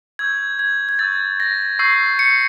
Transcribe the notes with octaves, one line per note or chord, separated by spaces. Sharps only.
C#6 E6 G6 G#6
G#6
G#6
C#6 E6 G6 A6
A#6
C#6 E6 G6 C7
C#7